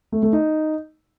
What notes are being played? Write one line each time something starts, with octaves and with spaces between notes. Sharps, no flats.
A3
A3
D#4